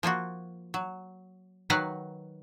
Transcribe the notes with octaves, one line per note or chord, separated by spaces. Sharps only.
F3 A#3 F4 F#4
F#3
D#3 F#3 B4 F5 F#5 A#5